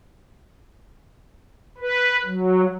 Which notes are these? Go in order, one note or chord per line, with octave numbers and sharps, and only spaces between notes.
B4
F#3